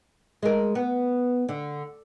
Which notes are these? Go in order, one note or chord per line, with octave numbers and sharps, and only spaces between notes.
G#3 A#4
B3
D3